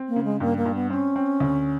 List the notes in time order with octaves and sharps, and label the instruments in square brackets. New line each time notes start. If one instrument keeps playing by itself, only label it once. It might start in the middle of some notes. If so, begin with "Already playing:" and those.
Already playing: [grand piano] C4
[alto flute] A#3
[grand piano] C#3
[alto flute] G#3
[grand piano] G2 [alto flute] A#3
[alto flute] A#3
[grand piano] G2
[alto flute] B3
[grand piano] C4 [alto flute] C#4
[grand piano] C4
D2